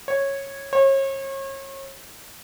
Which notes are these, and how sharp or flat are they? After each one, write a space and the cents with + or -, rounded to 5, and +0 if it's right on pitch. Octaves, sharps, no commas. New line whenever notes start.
C#5 -10
C#5 -35